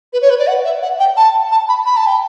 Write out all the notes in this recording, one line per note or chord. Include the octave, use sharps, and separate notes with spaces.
B4
C#5
B4
D5
F#5
E5
F#5
G5
A5
A5
B5
B5
A5
G5